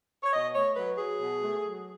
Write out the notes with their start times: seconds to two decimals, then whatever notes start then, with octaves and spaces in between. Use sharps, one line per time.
0.23 C#5
0.33 B2 D#5
0.54 A3 C#5
0.76 F#3 B4
0.98 F#3 G#4
1.20 B2
1.42 A3
1.63 F#3